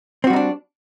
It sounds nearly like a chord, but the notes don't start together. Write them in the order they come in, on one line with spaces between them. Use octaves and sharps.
C4 F#4 G3 D#4 D4